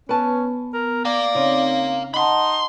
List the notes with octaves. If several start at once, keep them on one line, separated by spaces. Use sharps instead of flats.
B3 C#4 B4 A5
A#4
D5 F5 A#5
C#3 C4 D#4
D#4 D#5 F#5 A5 B5 C6